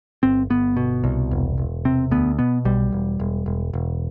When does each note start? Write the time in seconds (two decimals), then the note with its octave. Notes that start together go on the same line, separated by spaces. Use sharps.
0.23 G1 C4
0.50 G1 B3
0.77 B2
1.04 C2
1.31 E1
1.58 E1
1.85 C3 C4
2.11 D2 B3
2.39 B2 B3
2.65 B1 G3
2.92 E1
3.20 E1
3.46 E1
3.73 E1